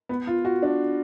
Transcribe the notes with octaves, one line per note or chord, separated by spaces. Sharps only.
B3
F4
F#4
D4